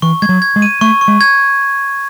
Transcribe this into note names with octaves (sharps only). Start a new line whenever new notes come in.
E3 C#6
G#3 G#6
F#3
G#6
G#3
D#7
A3 C#6
C#6
G#3
G#6